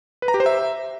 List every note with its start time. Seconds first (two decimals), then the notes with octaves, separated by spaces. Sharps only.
0.22 B4
0.28 A#5
0.34 G4
0.40 C5
0.46 E5